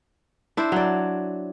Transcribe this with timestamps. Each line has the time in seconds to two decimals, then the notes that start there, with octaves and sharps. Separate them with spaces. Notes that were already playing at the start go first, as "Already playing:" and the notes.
0.57 D4 E4 C5
0.72 F#3 D5